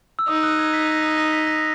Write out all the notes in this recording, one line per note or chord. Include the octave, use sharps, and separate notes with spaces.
E6
D#4 D#6
F#6
G#6
B6
A#6
A#6
A#6
B6
A#6